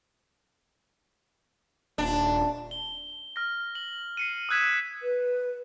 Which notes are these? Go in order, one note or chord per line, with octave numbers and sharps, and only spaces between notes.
D#1 D4
G7
F6 A#6
F#7
C7 C#7 D#7
D#6 E6 F#6 G#6 B6 E7
B4